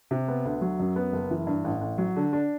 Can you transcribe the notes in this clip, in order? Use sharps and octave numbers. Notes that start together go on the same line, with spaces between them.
C3
B3
D2
F#3
F#2
B3
F#1
E3
G2
A1
A1
F#3
D3
D4